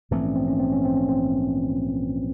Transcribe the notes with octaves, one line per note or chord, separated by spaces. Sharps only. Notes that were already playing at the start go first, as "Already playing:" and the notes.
A#1 G#2 E3 A3 C4
C#4
C4
C#4
C4
C#4
C4
C#4
C4